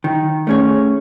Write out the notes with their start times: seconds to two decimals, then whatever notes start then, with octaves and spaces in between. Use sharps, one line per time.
0.04 D#3
0.47 A3 C#4 G#4 C#5